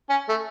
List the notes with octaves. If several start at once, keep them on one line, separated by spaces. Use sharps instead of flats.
C#4
A3